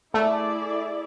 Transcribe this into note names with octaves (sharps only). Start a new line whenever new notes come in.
A3 E4 G#4 D5